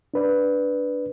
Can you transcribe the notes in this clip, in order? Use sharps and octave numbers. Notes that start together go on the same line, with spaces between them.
D4 B4 D5